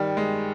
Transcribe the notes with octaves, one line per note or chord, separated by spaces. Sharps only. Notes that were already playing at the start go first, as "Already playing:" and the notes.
Already playing: D#3 G3
G#3